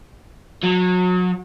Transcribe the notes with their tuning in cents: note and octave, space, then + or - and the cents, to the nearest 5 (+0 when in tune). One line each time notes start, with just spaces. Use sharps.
F#3 -30